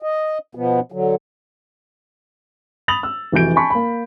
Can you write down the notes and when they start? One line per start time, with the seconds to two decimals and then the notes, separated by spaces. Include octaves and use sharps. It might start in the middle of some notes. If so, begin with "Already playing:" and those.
0.02 D#5
0.55 B2 F3 B3
0.92 D3 F#3
2.88 B5 D#6 A6 F7 F#7
3.03 E6
3.32 F1 E3 F#4 G6 D7
3.56 G#5 A5 B5 C#6 B6
3.70 A#3 B5